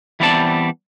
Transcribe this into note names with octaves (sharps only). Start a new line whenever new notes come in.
E3 G3 B3 C4 D5 A5